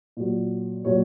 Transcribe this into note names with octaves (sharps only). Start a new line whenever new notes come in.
A#2 F#3
A#2 F#3 C#5